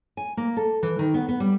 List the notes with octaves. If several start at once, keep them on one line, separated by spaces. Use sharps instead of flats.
G#5
A#3
A4
E3
D#3
B3
B3
G3